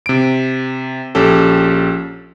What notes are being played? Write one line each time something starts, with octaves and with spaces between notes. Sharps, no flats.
C3 D7
A#1 C#4 G4 A4